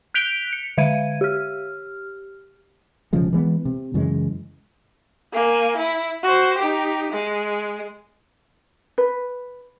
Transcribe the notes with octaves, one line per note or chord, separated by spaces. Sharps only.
F#6 G6 B6 D7 F7 G7
C#7
D3 E5 F5 G#6 D#7
G4 F6
E1 C#3 F3 G#3
E3 G#3 B3
C3
F#2 C#3 E3 G#3
A#3 G#5
E4
F#4 C5
D#4 G4
G#3
B4